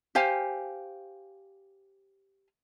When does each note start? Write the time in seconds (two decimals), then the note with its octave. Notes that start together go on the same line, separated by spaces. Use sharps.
0.15 G4 C5 F5 G#5